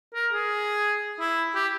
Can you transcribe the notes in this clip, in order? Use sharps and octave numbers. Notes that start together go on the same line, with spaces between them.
A#4
G#4
E4
G4